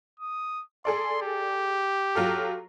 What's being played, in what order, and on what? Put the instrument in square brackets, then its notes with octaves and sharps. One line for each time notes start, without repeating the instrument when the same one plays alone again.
[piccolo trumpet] D#6
[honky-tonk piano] G#4 A4 D5 [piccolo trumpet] C6
[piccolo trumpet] G4
[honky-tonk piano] F#3 F4 A4